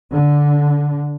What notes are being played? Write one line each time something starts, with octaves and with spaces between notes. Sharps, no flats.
D3